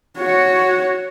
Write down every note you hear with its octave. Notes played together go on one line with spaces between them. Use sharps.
F#4 C#5